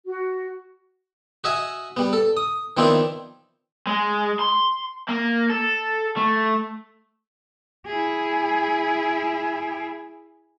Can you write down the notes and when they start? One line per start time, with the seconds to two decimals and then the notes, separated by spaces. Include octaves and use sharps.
0.06 F#4
1.44 F#4 D#5 E5 G#5
1.97 G3 B3
2.13 A4
2.37 D#6
2.77 D#3 F3 B3 C4 D4 E4
3.87 G#3
4.39 C6
5.09 A#3
5.50 A4
6.17 A3
7.86 E4 G#4